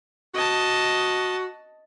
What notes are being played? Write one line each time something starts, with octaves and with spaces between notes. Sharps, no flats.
F#4 D#5 A5